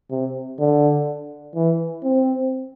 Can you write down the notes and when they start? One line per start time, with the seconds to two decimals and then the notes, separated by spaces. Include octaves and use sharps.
0.11 C3
0.59 D3
1.55 E3
2.04 C4